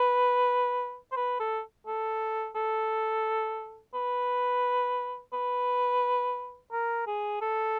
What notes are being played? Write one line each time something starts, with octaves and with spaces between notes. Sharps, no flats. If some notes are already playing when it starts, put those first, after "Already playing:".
Already playing: B4
C5
B4
A4
A4
A4
B4
B4
A#4
G#4
A4